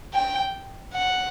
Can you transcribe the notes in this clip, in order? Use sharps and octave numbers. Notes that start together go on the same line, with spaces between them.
G5
F#5